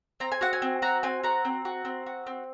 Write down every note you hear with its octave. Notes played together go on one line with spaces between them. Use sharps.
C4 A#5
G#5
F#4 F#5
G#5
C4
F#4 A#5
C4 G#5
F#4 A#5
C4
F#4
C4
F#4
C4